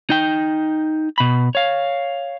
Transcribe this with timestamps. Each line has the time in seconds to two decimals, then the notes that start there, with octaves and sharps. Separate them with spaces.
0.10 D#4 G5
1.18 B2 B5
1.55 C#5 F5